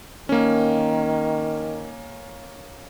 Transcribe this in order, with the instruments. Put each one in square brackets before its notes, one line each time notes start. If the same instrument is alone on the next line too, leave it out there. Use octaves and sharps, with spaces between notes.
[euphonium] D#3 [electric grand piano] A#3 C#4